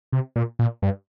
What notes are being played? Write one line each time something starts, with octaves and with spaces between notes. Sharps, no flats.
C3
A#2
A#2
G2